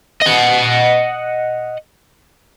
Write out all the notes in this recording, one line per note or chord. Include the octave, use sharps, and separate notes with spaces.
D#5 F#5